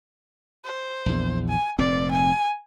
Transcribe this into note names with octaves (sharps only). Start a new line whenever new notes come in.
C5
A#1 E2
G#5
F1 A#2 C4 D5
G#5